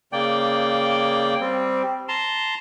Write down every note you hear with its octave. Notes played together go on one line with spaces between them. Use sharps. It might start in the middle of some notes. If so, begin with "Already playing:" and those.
C#3 A#3 D5 G5
G3 C4
A5 A#5 C6